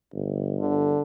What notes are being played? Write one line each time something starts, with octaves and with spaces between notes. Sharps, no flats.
G1
D3